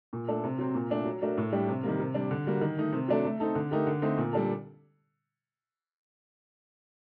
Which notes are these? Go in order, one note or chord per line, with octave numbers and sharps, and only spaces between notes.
A#2
A3 D4 A4
C3
F#3 C4
A#2
A3 D4
F#3
A3 D4 F#4 A#4
A2
G3 D4 G4
C3
D#3 G3 A#3
C3
G3 D4
D3
G3 A#3 F#4
D#3
A3 D#4
C3
F#3 A3 D4 A4
A3
C4 D#4 A4
D3
A3 D#4 G4 A#4
D3
A3 C4 D#4
A#2
G3 D4 A4